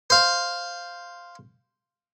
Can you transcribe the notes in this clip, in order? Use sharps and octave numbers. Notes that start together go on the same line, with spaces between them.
C5 F5